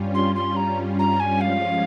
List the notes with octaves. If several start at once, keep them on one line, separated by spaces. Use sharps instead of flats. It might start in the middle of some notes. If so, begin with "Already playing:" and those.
Already playing: G2 G3 C#4 F4
C6
C6
A#5
A#5
G#5
F3 G#3 C#4 F4 F5